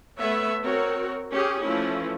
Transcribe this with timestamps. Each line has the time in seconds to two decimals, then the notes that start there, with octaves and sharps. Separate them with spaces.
0.18 A3 B3 B4 C#5 E5
0.63 C4 F#4 A#4 C#5
1.31 C#4 G4 G#4
1.63 E3 F3 A3 C#4 E4